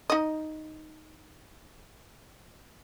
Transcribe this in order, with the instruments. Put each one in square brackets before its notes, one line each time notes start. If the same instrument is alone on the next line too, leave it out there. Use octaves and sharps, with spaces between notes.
[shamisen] D#4 D#5